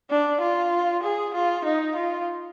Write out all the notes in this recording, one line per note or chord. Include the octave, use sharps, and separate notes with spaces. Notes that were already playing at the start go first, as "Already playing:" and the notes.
D4
F4
G#4
F4
D#4
F4